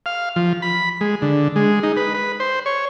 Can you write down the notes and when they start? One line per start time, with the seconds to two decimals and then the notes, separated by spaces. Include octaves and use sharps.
0.06 F5
0.36 F3
0.62 B5
1.01 G#3
1.22 D3
1.56 G#3
1.83 D#4
1.97 B4
2.14 B4
2.40 C5
2.66 C#5